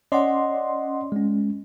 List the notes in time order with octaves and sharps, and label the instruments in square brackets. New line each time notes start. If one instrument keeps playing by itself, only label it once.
[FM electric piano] C#4 D5 C6 [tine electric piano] D#5 F#5
[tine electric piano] G#3 C#4